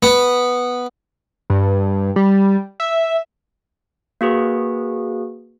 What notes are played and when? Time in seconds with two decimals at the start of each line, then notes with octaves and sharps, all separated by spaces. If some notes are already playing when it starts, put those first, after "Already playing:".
0.03 B3
1.50 G2
2.16 G3
2.80 E5
4.21 A#3 F#4 G#4 B4